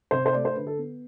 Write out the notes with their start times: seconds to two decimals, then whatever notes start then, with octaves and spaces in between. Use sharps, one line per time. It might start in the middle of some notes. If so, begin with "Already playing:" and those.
0.11 C3 C5
0.26 C5
0.33 A3 D5
0.45 C5
0.56 D3 B4
0.67 A4
0.78 B3